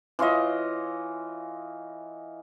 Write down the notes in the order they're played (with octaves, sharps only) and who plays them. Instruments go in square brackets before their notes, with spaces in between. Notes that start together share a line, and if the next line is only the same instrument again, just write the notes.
[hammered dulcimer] E3 F4 C#5 D#5